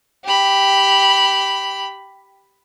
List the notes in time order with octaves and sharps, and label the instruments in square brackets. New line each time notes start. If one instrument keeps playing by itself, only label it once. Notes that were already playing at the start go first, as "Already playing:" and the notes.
[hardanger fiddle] G4 B5